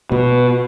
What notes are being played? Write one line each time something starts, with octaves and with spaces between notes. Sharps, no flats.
B2